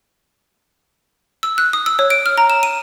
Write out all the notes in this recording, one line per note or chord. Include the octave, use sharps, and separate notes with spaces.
E6
F#6
D#6
E6
C#5
D7
F6
A#5
E7
D#7